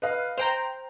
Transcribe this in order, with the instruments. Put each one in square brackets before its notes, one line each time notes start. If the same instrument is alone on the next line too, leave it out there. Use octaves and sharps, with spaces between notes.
[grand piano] B4 D#5 F5
[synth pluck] C5 G5 A#5 [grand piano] F7